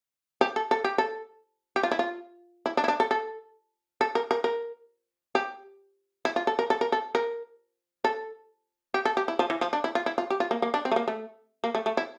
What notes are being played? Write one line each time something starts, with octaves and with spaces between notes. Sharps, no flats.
G4
A4
A4
G4
A4
G4
F4
E4
F4
E4
D4
E4
D4
A4
A4
A4
A#4
A#4
A#4
G4
E4
F4
A4
A#4
A4
A#4
A4
A#4
A4
G4
A4
G4
E4
F3
E3
F3
D4
E4
F4
E4
F4
G4
F4
A#3
A#3
D4
C4
A3
A#3
A3
A#3
A3
A3
E4